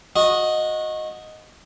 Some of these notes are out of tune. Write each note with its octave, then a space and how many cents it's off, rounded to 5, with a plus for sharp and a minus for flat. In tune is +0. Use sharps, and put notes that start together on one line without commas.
F#4 -25 D#5 +0